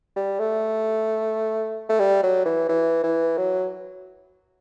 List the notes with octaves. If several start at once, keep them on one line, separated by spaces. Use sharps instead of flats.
G3
A3
A3
G3
F#3
E3
E3
E3
F#3